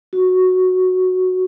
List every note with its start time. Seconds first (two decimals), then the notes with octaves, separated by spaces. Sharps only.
0.13 F#4